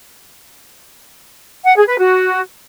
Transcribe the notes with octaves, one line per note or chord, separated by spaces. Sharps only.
F#5
G#4
B4
F#4